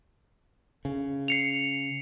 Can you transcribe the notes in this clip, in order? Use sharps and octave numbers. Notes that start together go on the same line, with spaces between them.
C#3
C7 C#7 F7